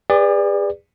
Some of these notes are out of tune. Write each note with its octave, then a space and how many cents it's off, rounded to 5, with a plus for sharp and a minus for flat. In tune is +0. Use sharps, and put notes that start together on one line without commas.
G#4 -45 B4 +0 D5 +0